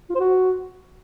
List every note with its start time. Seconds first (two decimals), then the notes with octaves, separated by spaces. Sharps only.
0.10 F4
0.15 C5
0.20 F#4